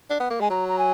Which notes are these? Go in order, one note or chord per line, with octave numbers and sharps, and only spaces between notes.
D4
B3
A#3
G#3 G#5
F#3 A#5
A#5
G#5